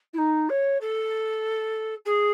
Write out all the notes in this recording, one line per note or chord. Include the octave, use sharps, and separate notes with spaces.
E4
D#4
C#5
A4
G#4